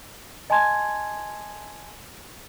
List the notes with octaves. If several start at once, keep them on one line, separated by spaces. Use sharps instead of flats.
D#5 G#5 A5 C6 G#6